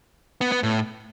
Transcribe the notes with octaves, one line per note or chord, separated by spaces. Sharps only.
B3
B3
A2